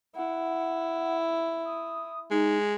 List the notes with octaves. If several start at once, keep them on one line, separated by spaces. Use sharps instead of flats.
E4 F#5
D#6
G#3 D#4